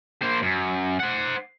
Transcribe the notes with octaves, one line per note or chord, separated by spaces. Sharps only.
A#3 C5
F#2
C5 F#5